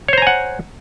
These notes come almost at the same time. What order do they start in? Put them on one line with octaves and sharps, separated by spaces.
C#5 C5 A#5 G#5 F#5